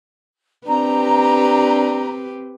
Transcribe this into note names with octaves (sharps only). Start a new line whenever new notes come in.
C4 D4 G4 B4 A#5